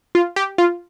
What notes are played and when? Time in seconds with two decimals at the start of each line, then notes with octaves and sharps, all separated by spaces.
0.15 F4
0.36 G4
0.58 F4